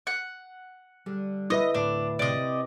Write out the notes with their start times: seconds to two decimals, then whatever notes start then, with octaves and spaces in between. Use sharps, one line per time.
0.07 F#5
1.06 D3 G3
1.50 E4 B4 D#5 E5
1.75 D2 A2 D4
2.19 C3 D5 D#5